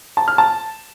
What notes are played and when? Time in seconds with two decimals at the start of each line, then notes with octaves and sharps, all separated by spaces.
0.17 A5
0.28 F6
0.38 A5